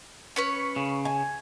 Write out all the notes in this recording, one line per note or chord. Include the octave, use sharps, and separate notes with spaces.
C#4 B4 C#5
C#3
G#5